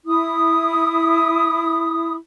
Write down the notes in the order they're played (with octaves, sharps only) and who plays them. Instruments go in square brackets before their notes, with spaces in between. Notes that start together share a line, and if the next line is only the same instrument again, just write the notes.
[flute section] E4 D#6